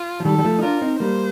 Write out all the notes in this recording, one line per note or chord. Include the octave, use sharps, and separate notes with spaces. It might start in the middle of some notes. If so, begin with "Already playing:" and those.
Already playing: F4
F3
D#3 G3 A4
G3
F3 A3
D#4
D4 F4 A#4
C4 D#4
G3 A#3 C5